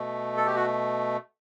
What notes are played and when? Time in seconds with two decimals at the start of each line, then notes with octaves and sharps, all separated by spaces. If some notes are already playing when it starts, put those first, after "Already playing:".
Already playing: B2 A3
0.37 A4
0.46 G4
0.56 F#4